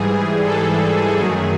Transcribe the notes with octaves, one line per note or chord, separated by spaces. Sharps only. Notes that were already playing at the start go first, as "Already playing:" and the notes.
Already playing: G#2 E3 G3 G#4
A4
F#2 D#3 F#3 A3 G#4